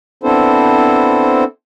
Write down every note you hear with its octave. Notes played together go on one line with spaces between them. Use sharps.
B3 C4 D4 E4 A4 C5